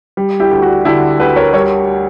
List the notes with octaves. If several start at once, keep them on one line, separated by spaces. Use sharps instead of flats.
G3
E4 G4
D2
F#4
D3 E4 G4
D2 G4 B4
A#4 C#5
G3 A#4 C#5